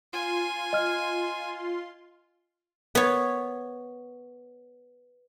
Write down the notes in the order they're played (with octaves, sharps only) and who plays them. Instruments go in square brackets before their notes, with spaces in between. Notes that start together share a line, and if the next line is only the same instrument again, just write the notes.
[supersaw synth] F4 C6 [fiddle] G#5
[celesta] D#5 F6
[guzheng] B3 C#5